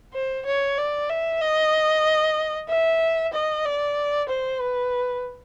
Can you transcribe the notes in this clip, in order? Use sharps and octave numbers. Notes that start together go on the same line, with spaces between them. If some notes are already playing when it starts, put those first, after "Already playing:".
C5
C#5
D5
E5
D#5
E5
D#5
D5
C5
B4